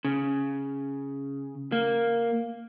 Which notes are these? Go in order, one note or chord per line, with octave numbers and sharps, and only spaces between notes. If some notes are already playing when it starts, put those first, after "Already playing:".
C#3
A#3